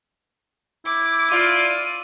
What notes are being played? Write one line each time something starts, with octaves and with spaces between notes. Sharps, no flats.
E4 D6
F4 D5 D#7